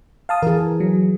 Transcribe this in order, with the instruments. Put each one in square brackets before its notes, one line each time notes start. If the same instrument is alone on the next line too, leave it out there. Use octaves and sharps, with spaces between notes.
[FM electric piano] F5 A5 D#6
[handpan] E3 G#4 [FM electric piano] A#4
[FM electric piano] F#3